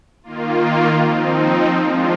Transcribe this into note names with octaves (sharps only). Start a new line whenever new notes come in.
D#3 A#3 F4
F3 C4 D#4
F3 G#3 D4 F4